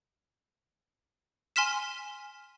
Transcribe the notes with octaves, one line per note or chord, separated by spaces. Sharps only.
G#5 C6 F6 B6 E7